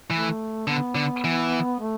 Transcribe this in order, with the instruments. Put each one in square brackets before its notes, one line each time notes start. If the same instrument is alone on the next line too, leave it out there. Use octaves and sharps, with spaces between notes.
[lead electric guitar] E3 [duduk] A3
[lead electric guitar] D3 [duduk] B3
[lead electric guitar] D3
E3
[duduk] A3